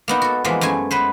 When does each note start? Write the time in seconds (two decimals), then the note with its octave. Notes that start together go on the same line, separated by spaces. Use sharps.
0.08 A#3 B3 D#4
0.22 F#4 A4
0.44 E3 F3 G#3 A#3 B3
0.61 F#2 G#3 A3 G#5
0.91 B3 B4 C5